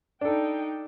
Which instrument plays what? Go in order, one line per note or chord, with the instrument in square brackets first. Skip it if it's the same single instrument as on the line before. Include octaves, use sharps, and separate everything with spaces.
[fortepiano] D4 A4 [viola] D#4 G5